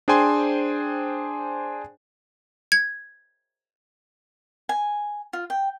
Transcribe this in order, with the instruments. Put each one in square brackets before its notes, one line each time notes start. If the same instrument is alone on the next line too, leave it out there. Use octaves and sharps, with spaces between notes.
[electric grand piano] D4 G#4 C5 G5 G#5 C6
[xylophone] G#6
[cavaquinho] G#5
F4
G5